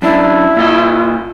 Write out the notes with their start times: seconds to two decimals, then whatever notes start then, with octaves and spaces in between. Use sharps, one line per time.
0.02 F#2 D4 E4
0.57 A#2 F4 D#5